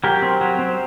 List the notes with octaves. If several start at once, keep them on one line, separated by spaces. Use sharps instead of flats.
F#3 G4 A#4
C4
F#3
C4